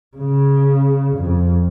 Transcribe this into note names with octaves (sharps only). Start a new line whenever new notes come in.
C#3
F2